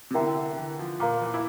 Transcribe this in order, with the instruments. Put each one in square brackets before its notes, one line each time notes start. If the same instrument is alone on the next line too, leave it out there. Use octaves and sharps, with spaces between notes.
[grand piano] C3
[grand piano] D3 [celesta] E4 A#4 E5 G5 A#5
[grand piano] D3
E3
F3
[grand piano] A#2 [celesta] A#4 F5 A#5 D6
[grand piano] E3
E4